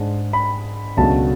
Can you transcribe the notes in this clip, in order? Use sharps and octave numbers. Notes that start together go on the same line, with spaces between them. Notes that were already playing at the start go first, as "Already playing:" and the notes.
Already playing: G#2 G#3 D4
B5
C#2 B2 F#3 A3 D4 A5